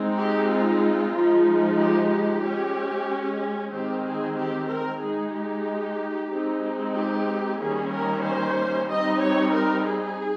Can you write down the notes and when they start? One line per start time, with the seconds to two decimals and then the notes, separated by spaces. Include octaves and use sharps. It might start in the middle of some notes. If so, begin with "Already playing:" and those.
Already playing: G#3 C4 D#4
0.18 G4
0.50 F4
1.14 F3 G#3 D#4
1.78 G4
2.10 G4
2.43 G#3 C#4
3.72 D#3 G#3 C4 G4
4.04 G#4
4.36 G4
4.68 A#4
5.01 G#3 D#4 G#4
5.32 G4
6.29 G#3 C4 D#4
6.94 G4
7.58 D#3 G3 A#3 C#4 G#4
7.91 A#4
8.23 C5
8.87 G3 C4 D#4 D#5
9.20 C#5
9.51 A#4
9.85 G#4